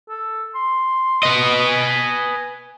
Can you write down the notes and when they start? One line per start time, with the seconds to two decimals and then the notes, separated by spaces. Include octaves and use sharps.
0.09 A4
0.55 C6
1.23 B4 D#5
1.67 G#5